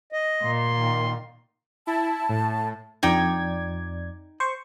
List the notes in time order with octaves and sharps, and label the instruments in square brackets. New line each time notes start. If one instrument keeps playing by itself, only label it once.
[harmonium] D#5
[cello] A#2 [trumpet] C6
[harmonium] D#3
[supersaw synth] E4 [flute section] A5
[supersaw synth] A2
[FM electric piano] F2 D5 G#6 [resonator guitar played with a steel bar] D#4 G5
[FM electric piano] C5 C#6